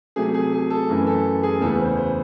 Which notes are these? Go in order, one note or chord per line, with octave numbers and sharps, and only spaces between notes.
C3 F#3 A3 G#4
G#4
G#4
A4
F#2 E3 A3
A4
G#4
E2 C#3 E3 A3 A4
C5
C5